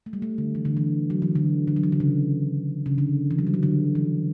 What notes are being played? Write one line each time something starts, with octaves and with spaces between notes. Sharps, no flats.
A3
G3
A3
D3
E3
D3
E3
F#3
E3
D3
D3
F#3
E3
D3
C#3
C#3
D3
E3
F#3
G3
F#3
D3
E3